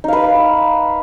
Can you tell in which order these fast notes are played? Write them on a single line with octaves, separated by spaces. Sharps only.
D#4 F5 B4